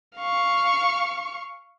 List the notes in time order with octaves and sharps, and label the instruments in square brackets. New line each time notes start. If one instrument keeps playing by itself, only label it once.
[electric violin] F5 C#6